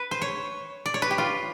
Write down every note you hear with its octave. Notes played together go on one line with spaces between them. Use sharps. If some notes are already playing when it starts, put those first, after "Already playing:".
Already playing: B4
C5
C#5
D5
C#5
B4
G4
F4